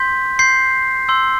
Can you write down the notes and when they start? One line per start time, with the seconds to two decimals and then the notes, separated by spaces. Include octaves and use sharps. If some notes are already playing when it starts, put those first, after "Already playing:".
Already playing: C6 G6 B6
0.39 C6 G6 C7
1.09 C6 E6 G6